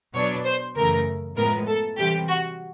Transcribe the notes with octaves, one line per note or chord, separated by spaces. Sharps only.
B2 F#3 B3 D4 C#5
C5
F#2 C#3 E3 A3 A#4
A2 F3 G#3 B3 A#4
A4
C3 E3 G3 G4
F#4